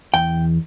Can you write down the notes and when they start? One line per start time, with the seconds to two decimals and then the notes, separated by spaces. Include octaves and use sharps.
0.14 E2 G5